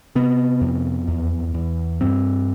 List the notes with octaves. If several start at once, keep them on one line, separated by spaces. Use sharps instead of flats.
C3 B3
F2
E2
E2
G2 C4